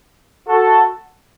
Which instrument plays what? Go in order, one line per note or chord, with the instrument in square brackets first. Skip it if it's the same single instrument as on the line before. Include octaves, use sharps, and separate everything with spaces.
[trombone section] F#4 A4